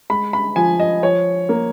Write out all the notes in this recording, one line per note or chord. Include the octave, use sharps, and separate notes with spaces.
G#3 B5
B5
F3 G#5
D#5
F3 C#5
A#3